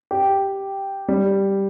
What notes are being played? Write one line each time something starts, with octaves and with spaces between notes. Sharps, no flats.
G4
G3